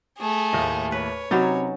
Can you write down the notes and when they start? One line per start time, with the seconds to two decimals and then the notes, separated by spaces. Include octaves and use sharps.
0.18 A3 G#4
0.53 D#2 A2 D#5
0.92 B4 C#5
1.31 C3 F#3 C#4 D#4 B5 A6